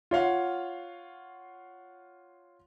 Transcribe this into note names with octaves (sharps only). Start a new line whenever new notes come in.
F4 C#5 F5 F#5